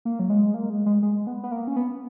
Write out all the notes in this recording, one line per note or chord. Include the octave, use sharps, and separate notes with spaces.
A#3
F#3
G#3
A#3
G#3
G#3
G#3
B3
B3
A#3
C#4
B3